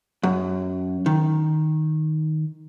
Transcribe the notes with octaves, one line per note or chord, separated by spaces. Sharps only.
F#2
D#3